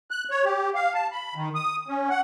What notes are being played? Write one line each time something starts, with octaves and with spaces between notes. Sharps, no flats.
F#6
C#5
G4
F5
A5
B5
D#3
D#6
C#4
F#5